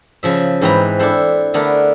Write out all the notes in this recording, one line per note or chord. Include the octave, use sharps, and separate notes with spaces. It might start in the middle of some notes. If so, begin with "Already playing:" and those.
C#3 F3 E5
G#2 E3 C4 B4 G5 A#5
D4 E4 A4 C5
D3 A3 B3 D4 A#4